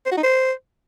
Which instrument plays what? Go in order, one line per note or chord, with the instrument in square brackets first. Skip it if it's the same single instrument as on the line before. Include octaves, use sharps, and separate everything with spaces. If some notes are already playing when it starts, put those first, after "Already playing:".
[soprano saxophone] C5
F#4
D#4
C5